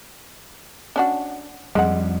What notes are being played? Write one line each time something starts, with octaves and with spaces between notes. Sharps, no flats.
C#4 D4 F#4
F2 G3 G#3 F#5